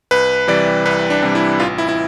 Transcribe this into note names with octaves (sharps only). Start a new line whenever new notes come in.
C2 B4
C3 E3 G3 D5
C2 B4
D4
C3 E3 G3
E4
A1 F4
E4
E4